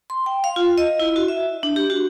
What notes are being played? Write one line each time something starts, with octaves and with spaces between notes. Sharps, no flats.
C6
G5
F5
F4
D#5
E4
F#4
E5
D4
G4
F#4